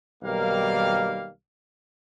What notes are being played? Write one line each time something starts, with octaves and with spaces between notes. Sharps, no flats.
B1 D#3 G3 A#3 A#4 F5